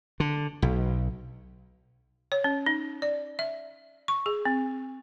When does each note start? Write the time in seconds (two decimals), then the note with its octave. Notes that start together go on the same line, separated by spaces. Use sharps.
0.20 D3
0.62 B1
2.32 C#5
2.44 C#4
2.66 D#4
3.02 D5
3.39 E5
4.08 C#6
4.26 G#4
4.45 C4